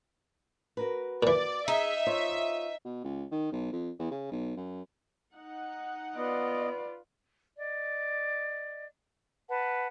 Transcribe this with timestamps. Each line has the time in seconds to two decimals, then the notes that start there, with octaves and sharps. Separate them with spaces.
0.77 F#4 A#4 B4
1.23 A#2 E3 D5
1.68 D#4 G#4 E5
2.07 F4 C5 C#5
2.85 B2
3.04 C#2
3.31 D#3
3.52 B1
3.72 F2
3.99 E2
4.11 C#3
4.31 B1
4.56 F#2
5.36 D#4 F#5
6.17 B3 F4 B4 D5 D#5
7.56 D5 D#5
9.48 B4 F#5 A5